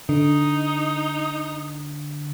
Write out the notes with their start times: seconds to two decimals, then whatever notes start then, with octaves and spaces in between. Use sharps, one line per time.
0.09 D3 D#4